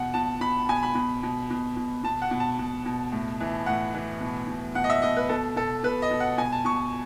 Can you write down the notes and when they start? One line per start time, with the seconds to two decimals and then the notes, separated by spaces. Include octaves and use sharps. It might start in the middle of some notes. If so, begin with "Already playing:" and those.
Already playing: B2 F#5
0.14 B2 A5
0.41 B2 B5
0.69 B2 G#5
0.83 B5
0.95 B2
1.23 B2
1.50 B2
1.77 B2
2.04 B2 A5
2.22 F#5
2.31 B2
2.40 A5
2.59 B2
2.86 B2
3.12 A2
3.40 E3
3.66 A2 F#5
3.94 E3
4.21 B2
4.48 B2
4.75 B2 F#5
4.84 D#5
4.90 E5
5.02 B2 D#5
5.17 B4
5.29 B2 A4
5.56 B2 A4
5.83 B2 B4
6.02 D#5
6.11 B2
6.20 F#5
6.38 B2 G#5
6.52 A5
6.65 B2 C#6